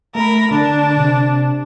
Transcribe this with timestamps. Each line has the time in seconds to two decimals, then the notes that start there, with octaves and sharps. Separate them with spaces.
0.15 A3 A#4 B5
0.51 D3 D4
0.98 C3